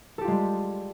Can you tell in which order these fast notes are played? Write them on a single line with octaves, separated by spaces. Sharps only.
A4 G4 F4 G#3 G3